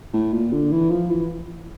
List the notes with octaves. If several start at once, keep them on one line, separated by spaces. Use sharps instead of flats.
A2
A#2
D3
E3
F3
E3